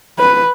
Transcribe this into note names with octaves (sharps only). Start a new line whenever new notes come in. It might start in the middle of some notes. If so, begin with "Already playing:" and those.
B4